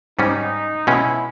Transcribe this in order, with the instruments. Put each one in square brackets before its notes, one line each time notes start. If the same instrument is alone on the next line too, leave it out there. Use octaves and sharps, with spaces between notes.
[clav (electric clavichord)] G#2 G3 C#4 [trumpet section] D#4
[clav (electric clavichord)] B2 G#3 C#4 [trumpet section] E4